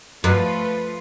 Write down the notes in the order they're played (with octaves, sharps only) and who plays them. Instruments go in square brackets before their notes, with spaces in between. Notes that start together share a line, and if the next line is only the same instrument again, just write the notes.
[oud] F#2 [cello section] F3 A3 F4 B4